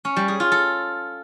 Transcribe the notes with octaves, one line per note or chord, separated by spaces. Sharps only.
C#4
G3
G#4
F4
A4